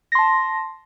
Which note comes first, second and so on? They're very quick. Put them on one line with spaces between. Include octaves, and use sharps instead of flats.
A#6 C6 A5